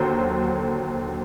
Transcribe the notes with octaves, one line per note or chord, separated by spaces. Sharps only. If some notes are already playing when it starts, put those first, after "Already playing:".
Already playing: D#2 D3 F#3 C5